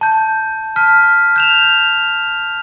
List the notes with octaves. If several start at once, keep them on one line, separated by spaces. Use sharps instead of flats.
A5 G6
A5 F6 B6
G6 E7 F7